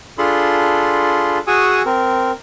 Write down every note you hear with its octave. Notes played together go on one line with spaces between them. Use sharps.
D4 F4 G#4 A4 B5 C6
F#4 G#4 G#5 C#6 D#6 E6
C4 A#4